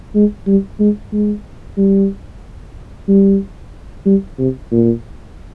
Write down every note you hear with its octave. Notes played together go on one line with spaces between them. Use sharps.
G#3
G3
G#3
G#3
G3
G3
G3
C3
A#2